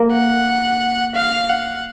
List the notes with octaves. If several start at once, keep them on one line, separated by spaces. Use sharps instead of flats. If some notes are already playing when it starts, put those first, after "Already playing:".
Already playing: A#3
F#5
F5
F#5